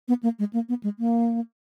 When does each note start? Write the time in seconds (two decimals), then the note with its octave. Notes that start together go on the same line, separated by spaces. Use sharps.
0.08 B3
0.23 A#3
0.39 G#3
0.53 A#3
0.69 B3
0.83 G#3
0.99 A#3